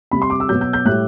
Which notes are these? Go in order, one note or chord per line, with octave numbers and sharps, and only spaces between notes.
C3 G3 B5
C6
D6
E6
B2 F#3 G6
G6
G6
A2 G3 F#6